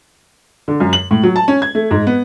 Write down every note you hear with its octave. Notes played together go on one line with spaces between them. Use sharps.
D3
F#2
F#7
A2
F#3
A5
C#4
G#6
A3
G#2
B3